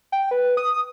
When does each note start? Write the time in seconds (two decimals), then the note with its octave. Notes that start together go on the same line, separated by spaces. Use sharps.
0.12 G5
0.31 B4
0.57 D#6